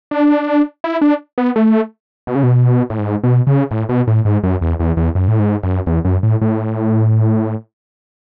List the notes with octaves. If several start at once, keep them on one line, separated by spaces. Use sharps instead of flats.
D4
E4
D4
B3
A3
B2
C#3
B2
A2
G#2
B2
C#3
A2
B2
A2
G#2
F#2
E2
E2
E2
F#2
A2
G#2
F#2
E2
F#2
A2
A2